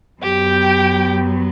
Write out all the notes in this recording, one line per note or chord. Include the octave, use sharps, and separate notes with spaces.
F#2 F#3 B3 G4 G5